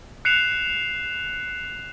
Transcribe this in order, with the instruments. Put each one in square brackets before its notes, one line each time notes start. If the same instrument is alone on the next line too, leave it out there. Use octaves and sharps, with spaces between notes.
[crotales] F#6 C7 C#7 E7 F7